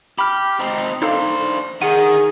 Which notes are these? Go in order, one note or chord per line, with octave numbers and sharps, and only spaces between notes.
G4 B5 F6
C4 D#4
D4 D#4 A4 C5 F5
D#3 G#4 F#5 D#7